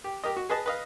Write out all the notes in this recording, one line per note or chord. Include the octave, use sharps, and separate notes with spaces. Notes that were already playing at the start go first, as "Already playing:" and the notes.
G4
G4 A#4 D#5
F#4
G#4 B4 D#5 A5
B4 D#5 F5